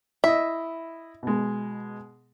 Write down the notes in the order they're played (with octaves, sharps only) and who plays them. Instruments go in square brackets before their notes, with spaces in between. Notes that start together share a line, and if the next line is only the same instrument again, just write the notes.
[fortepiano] E4 D#5 [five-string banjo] E5
[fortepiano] B2 G#3